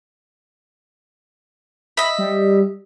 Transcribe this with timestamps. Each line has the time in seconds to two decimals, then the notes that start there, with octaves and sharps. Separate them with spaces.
1.97 D#5 E5 B5
2.18 G3